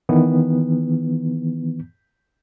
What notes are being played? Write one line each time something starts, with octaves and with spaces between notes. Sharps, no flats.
D#3 E3 B3